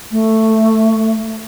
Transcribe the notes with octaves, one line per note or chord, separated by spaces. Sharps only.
A3